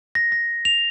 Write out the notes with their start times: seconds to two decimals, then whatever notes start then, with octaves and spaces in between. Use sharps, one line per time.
0.15 A#6
0.32 A#6
0.65 F7